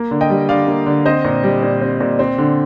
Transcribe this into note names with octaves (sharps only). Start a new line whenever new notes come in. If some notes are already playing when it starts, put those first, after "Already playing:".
Already playing: A#3
D3
D#5 G5
G3
D3 D5 F5
A#3
D3
C4 C5 D#5
A#2
G3
A#2
C4
A#2
C4
D3